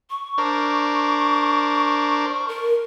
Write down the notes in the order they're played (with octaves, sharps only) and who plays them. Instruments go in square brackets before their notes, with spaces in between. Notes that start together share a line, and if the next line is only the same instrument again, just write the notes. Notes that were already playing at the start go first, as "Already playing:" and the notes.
[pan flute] C#6
[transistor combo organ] D4 A#4 C5
[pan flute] A#4